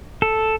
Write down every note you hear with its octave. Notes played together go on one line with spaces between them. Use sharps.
A4